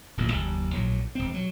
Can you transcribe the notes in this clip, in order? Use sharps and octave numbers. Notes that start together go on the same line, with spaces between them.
D1 A1 A#2 A#3
F#1 D#2
A#1 A2 F#3
E1 C4
F#3